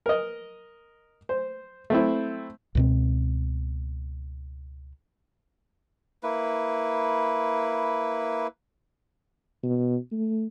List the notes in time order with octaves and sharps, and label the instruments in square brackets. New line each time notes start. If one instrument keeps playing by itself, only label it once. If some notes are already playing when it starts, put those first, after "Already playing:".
[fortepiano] A#4 D#5
C5
A3 C4 E4
[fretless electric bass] C#2 B2 C4
[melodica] A#3 E4 B4
[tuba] B2
A3